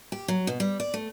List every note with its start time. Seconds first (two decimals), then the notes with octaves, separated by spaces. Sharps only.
0.12 G4
0.28 F#3
0.47 B2
0.60 G3
0.80 D5
0.94 A3